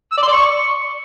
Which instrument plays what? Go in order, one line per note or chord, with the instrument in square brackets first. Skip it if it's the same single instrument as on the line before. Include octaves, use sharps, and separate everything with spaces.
[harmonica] E6
D5
C6
D5
C#6